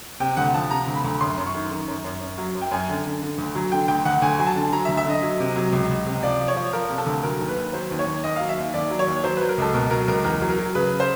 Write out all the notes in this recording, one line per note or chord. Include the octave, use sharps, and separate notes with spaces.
C3 G5
D2 F#5
F3 A5
C3 A#5
D2
B5
D2
F#2 C6
F#2
C#6
D#3
D#3
F#2
F#2
F#2
F#3
F#2
G5
F#2 G#5
D3
D3
D3
D2
F#3
D3 G5
D2 G5
D2 F#5
D2 G#5
F#3 G#5
A5
D3
F#3 A#5
E5
D2
E5
D3 D#5
F#3
C3
F#3
C#2
C#2
C3
F3 D5
F3
C#5
F3
F3 A#4
C3
A4
D2
F#3 A#4
D#2
B4
D#2
F#3 C5
D#2
C#5
D#2
D#2 D#5
F#3 F5
E5
D#2
D#2 D5
F#3
C#5
D#2
F#3 C5
F#3 B4
A#4
C#2 A4
B2 A#4
F#3 A#4
C#2 A#4
E2 A#4
F#3
A#4
F#3
C#3 B4
C5